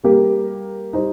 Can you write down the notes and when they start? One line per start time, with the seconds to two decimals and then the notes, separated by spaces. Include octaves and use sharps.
0.04 G3 A#3 G4 A#4
0.93 G3 D#4 C5